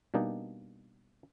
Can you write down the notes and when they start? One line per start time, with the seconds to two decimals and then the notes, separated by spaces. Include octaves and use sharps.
0.14 B2 G3 A#3 D4 D#4